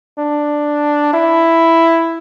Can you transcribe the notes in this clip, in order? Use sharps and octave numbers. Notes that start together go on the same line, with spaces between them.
D4
E4